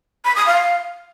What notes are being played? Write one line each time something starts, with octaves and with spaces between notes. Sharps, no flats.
B5
D#6
F5